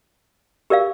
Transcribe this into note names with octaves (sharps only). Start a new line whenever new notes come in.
G4 A#4 D5 F5